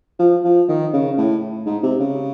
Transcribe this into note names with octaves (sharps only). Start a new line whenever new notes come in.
F3
F3
D#3
C#3
A2
G#2
C3
C#3